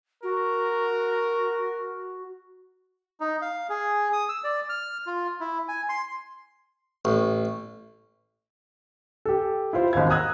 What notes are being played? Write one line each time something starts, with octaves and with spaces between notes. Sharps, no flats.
F#4 A#4
D#4
F5
G#4
D#6
E6
D5
F6
F4
E4
G#5
C6
A1
G4 A4
E4 F4 C5
G#1 D#2 G#2 F5 G#6
A#5 D#6 E6 F#6 G#6